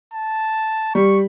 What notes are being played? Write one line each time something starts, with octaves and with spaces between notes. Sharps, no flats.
A5
G3 C#6